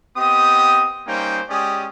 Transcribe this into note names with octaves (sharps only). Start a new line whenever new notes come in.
B3 C4 G4 D#5 D#6
G3 A#3 C#4 D#4 C5 G5
G#3 C#4 G4 D5 D#6